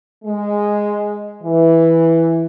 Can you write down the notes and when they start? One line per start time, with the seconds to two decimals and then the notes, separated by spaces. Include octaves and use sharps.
0.24 G#3
1.43 E3